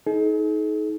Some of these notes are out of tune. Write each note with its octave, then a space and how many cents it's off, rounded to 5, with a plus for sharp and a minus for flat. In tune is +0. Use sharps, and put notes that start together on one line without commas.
D#4 +25 G#4 +45